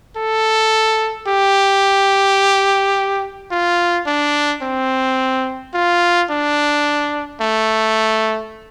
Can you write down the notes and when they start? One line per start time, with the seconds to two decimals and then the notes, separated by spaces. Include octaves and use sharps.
0.16 A4
1.27 G4
3.51 F4
4.06 D4
4.62 C4
5.74 F4
6.30 D4
7.41 A3